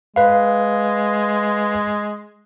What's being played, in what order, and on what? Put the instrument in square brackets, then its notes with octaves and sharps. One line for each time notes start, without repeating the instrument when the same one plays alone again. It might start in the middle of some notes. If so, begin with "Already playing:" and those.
[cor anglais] G#3 [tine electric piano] B4 F5